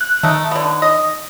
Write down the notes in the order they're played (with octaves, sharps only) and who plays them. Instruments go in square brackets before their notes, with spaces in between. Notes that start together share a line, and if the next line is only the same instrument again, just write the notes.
[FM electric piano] F#6
[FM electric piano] D#3 [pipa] A3 D#4
[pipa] D3 B3
D#5